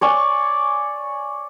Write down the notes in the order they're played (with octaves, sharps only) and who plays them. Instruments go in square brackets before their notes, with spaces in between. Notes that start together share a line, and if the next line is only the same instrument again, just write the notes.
[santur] C#5 D5 G#5 C#6